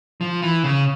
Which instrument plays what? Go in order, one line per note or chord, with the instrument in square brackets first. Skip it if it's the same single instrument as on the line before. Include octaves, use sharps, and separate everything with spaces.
[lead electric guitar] F3
E3
C#3